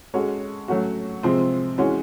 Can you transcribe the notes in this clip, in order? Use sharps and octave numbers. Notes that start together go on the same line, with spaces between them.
G#3 C#4 F#4 A4 C#5
F#3 A3 C#4 F#4
C3 F3 G#3 C4
E3 G#3 C#4 F#4